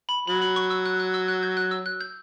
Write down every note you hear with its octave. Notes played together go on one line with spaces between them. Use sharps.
B5
F#3 B5
B5
C#6
E6
F#6
F#6
E6
F#6
G6
F#6
E6
F#6
G6